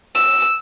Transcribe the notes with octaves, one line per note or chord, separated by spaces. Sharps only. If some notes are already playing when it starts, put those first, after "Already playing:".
E6